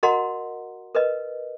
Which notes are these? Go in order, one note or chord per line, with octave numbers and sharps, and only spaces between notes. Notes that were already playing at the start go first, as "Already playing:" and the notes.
F#4 A#4 D#5 F#5 A#5 C6
A#4 B4 D#5